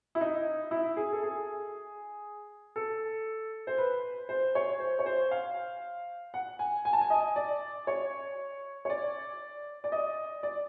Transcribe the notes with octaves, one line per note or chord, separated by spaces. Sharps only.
E4
D#4
E4
G#4
A4
G#4
A4
C5
B4
C5
C#5
C5
C#5
C5
F5
F#5
G#5
G#5
A5
G#5
D#5
D5
C#5
C#5
D5
D5
D#5
D5